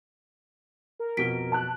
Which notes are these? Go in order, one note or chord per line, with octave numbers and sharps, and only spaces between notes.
A#4
F2 B2 B6 D7 G7
A5 F#6